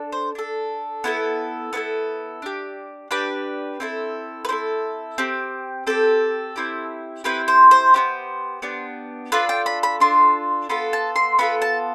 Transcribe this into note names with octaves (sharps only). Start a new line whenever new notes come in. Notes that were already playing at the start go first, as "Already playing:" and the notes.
Already playing: D4 A4
C5
D4 A4
B3 E4 A4
B3 E4 A4 B4
D4 G4
D4 G4 B4
C4 E4 A4
B4
C4 E4 A4 C5
C4 G4
C4 G4 A4
C4 E4 G4
C4 E4 G4 B4
C5
C5
B3 D4 G4
B3 D4 G4
D4 F4 A4 B4
G5
B5
B5
D4 F4 A4 C6
B3 F4 A4 B5
A5
C6
B3 F4 A4 B5
A5